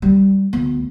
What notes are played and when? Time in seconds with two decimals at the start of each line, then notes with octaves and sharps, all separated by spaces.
0.02 G3
0.53 D2 B3